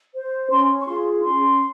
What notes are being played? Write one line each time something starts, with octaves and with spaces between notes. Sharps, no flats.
C5
C#4 C6
C#6
F4 G#4 C6
C#4 C6